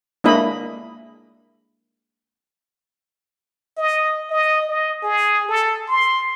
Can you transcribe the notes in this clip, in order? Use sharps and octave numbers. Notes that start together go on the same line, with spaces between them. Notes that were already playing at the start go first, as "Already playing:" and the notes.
G#3 A#3 D4 E4 D#5 B5
D#5
D#5
D#5
G#4
A4
C6